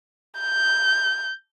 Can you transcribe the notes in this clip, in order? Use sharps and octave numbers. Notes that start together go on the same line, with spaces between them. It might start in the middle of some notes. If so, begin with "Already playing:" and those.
G6